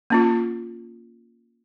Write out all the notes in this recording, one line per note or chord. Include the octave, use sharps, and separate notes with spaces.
A#3 C#4 F4